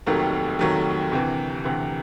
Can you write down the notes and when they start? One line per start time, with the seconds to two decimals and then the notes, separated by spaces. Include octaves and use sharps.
0.06 F1 D#2 D#3 F#3 A3
0.59 F1 D#2 D#3 F#3 A3
1.12 D2 C3 E3
1.64 D2 C3 E3